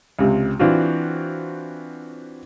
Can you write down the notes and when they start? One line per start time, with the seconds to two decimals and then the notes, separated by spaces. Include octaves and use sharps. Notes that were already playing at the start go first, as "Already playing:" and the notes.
0.19 C#2 C3
0.59 E3 C4 D4 F4 F#4